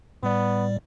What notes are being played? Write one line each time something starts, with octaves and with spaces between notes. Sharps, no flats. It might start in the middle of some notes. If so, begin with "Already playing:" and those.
A2 G3 B3 D5